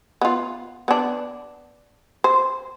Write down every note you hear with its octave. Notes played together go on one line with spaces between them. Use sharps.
B3 F4
B3 D4
C5